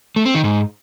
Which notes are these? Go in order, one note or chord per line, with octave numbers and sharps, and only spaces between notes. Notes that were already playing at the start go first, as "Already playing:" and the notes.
A3
C4
D#3
G#2